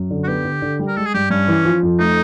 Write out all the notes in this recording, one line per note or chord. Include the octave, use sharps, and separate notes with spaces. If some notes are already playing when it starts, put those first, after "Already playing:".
Already playing: F#2
D3
F#4
B3 G4
D3
D3
G3
A#4
G#3 A4
G#4
G2 G4
G2 C#4
E3
F3
F2
A3 D#4